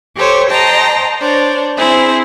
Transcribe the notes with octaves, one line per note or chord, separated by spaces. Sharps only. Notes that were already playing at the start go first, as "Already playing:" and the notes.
G4 A4 C5 C#5
C5 D#5 G5 A5 A#5
D4 C5 C#5
C4 E4 G#4 C5